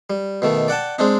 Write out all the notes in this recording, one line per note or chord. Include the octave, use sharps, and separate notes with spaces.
G3
B2 D#3 A3
D5 F#5 G5 A5
G#3 C4 D4 D#4